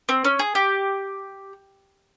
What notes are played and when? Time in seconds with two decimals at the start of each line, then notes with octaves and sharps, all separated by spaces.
0.09 C4
0.25 C#4
0.39 G#4
0.55 G4